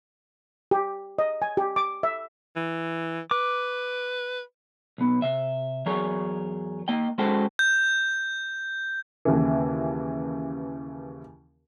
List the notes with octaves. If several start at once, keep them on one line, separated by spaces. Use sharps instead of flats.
G4
D#5
G#5
G4
D6
E5
E3
B4 D6
B1 B3
C3 E5
E2 F#3 G#4 A#4 C#5
A#3 D#5 G5
G#3 C#4 F#4 A4 C5 G5
G6
D#2 C#3 E3